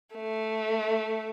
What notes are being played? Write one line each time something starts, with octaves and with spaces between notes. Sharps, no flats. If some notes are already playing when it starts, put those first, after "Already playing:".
A3